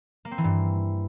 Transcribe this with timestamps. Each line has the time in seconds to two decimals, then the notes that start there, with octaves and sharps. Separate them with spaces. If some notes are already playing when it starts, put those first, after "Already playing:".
0.25 A#3
0.31 C4
0.38 E3
0.44 G2